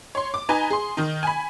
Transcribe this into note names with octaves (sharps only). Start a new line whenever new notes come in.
C#5 C6
D6
D#4 B4 G#5 A#5
G#4 C6
D#3 D#4
G#5 B5